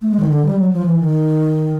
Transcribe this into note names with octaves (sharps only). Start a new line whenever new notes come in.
A3
G#3
D#3
D3
G3
F#3
F3
E3
D#3